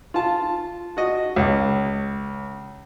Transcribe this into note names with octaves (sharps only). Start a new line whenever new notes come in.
F4 A5
F#4 D#5
C#2